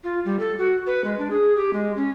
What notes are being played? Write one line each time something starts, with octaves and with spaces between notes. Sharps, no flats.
F4
G3
A4
F#4
B4
G#3
D4
G#4
G4
G#3
C#4